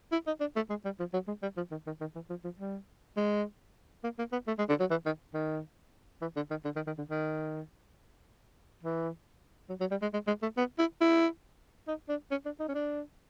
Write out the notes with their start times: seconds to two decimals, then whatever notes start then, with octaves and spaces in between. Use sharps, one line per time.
0.12 E4
0.27 D#4
0.40 D4
0.56 A3
0.70 G#3
0.85 G3
0.99 F3
1.13 F#3
1.27 G#3
1.42 G3
1.57 F3
1.71 D#3
1.87 D#3
2.01 D#3
2.15 E3
2.30 F3
2.44 F3
2.59 G3
3.17 G#3
4.04 A#3
4.19 A#3
4.32 B3
4.47 A3
4.58 G#3
4.69 D3
4.80 F#3
4.90 E3
5.06 D#3
5.34 D#3
6.21 E3
6.36 D3
6.50 D#3
6.65 D3
6.76 D#3
6.87 D#3
6.98 D3
7.09 D#3
8.83 E3
9.69 F#3
9.80 F#3
9.91 G3
10.02 G#3
10.13 G#3
10.27 G#3
10.42 A3
10.57 B3
10.78 E4
11.01 E4
11.87 D#4
12.09 D4
12.31 C#4
12.45 D4
12.60 D#4
12.69 C#4
12.75 D4